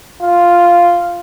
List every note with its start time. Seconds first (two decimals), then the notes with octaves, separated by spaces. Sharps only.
0.22 F4